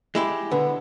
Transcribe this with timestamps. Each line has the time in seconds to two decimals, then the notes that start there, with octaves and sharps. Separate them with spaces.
0.15 G#3 E4 G4
0.51 D3 B3